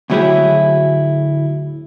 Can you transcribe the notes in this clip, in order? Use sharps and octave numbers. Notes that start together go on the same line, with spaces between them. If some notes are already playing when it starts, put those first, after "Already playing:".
D2 A2 F#3 E4 G4 G#4